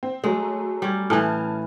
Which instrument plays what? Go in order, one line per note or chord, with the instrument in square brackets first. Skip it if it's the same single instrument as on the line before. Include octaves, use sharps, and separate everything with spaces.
[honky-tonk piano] C4
[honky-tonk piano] F#3 A3 [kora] G#3
[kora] G3 C#4
[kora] A2 E3 [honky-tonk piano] G#5 A5 F6